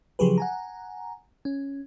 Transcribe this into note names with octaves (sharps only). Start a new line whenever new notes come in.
C#3 F3 F#3 G4 G#4 B4
F#5 G#5 A#5
C#4